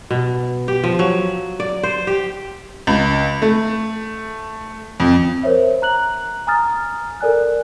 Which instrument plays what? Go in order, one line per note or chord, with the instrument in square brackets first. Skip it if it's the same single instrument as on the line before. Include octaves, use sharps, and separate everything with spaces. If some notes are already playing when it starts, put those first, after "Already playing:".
[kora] B2
G4
F3
F#3
D5
C5
G4
[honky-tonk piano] C#2
A3
F2
[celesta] A#4 C5 C#5 E5
A#5 F#6 F#7
G#5 A#5 D#6 F6 A6
A4 A#4 D5 G#5 F#6